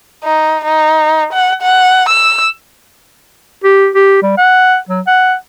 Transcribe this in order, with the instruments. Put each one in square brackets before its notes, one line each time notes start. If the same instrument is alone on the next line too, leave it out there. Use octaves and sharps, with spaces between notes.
[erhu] D#4
D#4
F#5
F#5
E6
[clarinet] G4
G4
G3
F#5
F#3
F#5